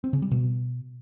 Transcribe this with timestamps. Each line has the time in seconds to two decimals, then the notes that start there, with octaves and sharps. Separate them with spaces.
0.04 C4
0.13 C#3
0.22 G3
0.31 B2